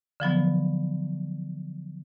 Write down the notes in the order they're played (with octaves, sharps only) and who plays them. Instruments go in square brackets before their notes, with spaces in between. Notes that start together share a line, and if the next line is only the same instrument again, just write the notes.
[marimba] D3 F3 F#3 B3